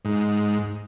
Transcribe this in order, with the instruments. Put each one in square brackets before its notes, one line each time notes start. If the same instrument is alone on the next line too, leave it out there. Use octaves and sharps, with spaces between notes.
[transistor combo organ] G#2